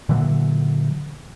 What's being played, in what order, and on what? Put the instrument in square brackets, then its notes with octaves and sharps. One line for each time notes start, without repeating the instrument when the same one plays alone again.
[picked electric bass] A#2 D3 E3 F#3